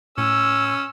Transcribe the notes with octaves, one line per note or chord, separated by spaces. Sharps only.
A2 C#4 E6